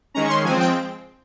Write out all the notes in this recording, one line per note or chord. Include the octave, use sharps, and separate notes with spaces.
D#3 G#3 C#4 A#5
C#6
C6
F3 G#3 C4 G#5
G5